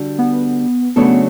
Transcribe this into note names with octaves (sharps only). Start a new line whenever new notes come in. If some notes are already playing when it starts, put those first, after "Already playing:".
Already playing: D3 G3 D4 F#4
B3
C#3 F#3 A3 B3 D4 A4